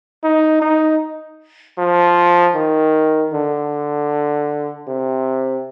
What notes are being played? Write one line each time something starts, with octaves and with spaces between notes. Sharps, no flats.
D#4
D#4
F3
D#3
D3
C3